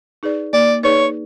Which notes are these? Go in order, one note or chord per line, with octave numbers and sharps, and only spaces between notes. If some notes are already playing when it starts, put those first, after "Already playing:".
D#4 G#4 B4 D5
A#3 D5
D#4 G#4 B4 C#5 D5